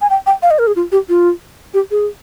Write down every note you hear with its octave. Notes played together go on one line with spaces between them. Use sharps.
G#5
G5
G5
F5
D#5
A#4
G#4
F4
G4
F4
G4
G#4